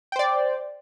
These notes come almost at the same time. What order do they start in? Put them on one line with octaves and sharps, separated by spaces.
G5 C5 D5